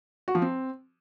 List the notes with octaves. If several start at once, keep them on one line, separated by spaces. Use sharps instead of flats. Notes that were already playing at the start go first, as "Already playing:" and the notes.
F#4
F3
C4